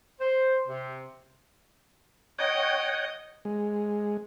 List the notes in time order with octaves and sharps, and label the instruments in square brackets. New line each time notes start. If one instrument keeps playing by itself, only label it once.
[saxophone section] C5
C3
[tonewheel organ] C#5 F#5 G5 [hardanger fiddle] D#5
[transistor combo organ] G#3